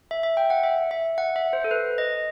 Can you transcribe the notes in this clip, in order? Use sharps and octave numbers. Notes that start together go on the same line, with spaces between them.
E5
E5
G5
F#5
E5
E5
F#5
E5
C5
A4
B4
D#5